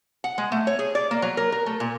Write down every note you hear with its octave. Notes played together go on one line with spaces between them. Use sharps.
F#5
G#3
A3
C#5
G#4
D5
A#3
F#3
A#4
A#4
A3
A#2